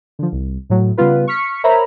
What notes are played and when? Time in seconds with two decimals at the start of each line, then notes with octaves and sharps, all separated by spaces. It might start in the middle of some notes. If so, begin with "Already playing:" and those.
0.19 D3 F3
0.32 C2
0.70 A2 F#3
0.97 C#3 G3 B3 F4 B4
1.28 C#6 F6 B6 C#7
1.64 A#4 C5 C#5 E5 A#5 B5